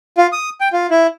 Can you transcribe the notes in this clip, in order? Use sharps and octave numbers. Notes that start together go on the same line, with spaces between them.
F4
D#6
G5
F4
E4